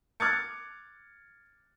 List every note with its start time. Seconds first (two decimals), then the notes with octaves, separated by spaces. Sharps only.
0.20 D6 F6 F#6 G#6 A6 C#7